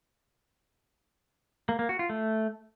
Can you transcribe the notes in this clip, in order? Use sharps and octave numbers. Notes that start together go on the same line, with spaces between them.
A#3
A#3
F#4
F4
A3